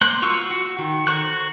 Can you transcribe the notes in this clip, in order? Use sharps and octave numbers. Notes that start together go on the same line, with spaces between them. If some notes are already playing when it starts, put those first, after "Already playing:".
A#3 C5 F#6
F4 F#4 C#6 E6
F#4
D#3
F#4 A4 C5 C#6 F#6